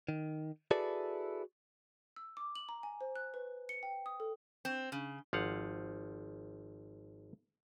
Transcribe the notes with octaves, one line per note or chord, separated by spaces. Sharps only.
D#3
E4 F#4 G#4 A4 B4 D5
E6
D6
F#7
A#5
G#5
C5
F#6
B4
C#7
G5
D#6
A4
C4
C#3
G#1 F3 F5 F#5